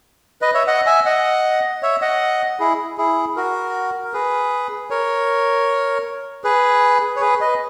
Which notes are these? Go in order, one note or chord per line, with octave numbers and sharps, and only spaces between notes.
B4 D#5
C#5 E5
D#5 F#5
E5 G#5
D#5 F#5
C#5 E5
D#5 F#5
E4 G#4
E4 G#4
F#4 A#4
A#4
G#4 B4
A#4 C#5
G#4 B4
C#5
G#4 B4
B4 D#5